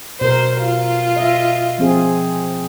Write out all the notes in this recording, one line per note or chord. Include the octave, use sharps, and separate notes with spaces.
B2 A#4 C5
F4
D#5 E5
F3 C4 G#4